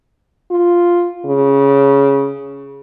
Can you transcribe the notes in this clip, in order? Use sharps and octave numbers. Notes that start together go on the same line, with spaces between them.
F4
C#3